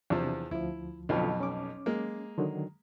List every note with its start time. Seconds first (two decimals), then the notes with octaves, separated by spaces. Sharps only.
0.10 E2 C3 F3 D4
0.51 D2 F3 E4
1.09 B1 F2 B2 D3 F3 F4
1.40 C#4 D6
1.86 G#3 A#3
2.38 D3 D#3 F#3